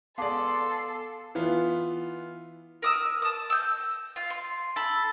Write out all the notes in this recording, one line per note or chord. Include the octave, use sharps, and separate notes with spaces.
B3 G#4 A4 D5 F5 A5 C6 D6
E3 B3 F4
A#4 D#6 E6
A5 D#6
E6 G6
F4
C6
A4 B5